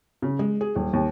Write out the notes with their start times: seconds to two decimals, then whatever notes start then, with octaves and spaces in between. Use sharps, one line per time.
0.22 C#3
0.39 G#3
0.61 G#4
0.75 D#1
0.93 D#2